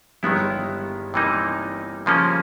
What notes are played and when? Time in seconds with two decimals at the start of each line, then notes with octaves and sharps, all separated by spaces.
0.23 G1 G2 D#3 G#3 B3 E4
1.14 C3 E3 G3 A#3 D#4
2.06 C#3 F3 A#3 C#4